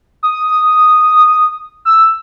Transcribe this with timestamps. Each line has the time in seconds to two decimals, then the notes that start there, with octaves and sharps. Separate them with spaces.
0.23 D#6
1.85 E6